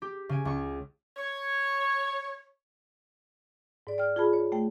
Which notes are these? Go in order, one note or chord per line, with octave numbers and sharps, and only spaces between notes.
G4
C#3 G#5 D7
C#2 C#6
C#5
G#2 D5
D5 G5 F6
F4 G#4 A5 B5
C#5
A3 G5